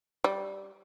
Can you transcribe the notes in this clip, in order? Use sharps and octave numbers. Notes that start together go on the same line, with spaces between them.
G3